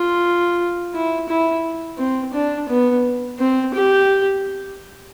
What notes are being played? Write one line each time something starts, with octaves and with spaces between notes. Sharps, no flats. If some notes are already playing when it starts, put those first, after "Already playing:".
Already playing: F4
E4
E4
C4
D4
B3
C4
G4